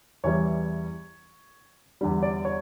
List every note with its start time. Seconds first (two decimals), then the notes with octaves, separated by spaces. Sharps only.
0.24 E2 E3 G3 C#5
2.01 E2 D3 G3
2.23 D5
2.45 C#5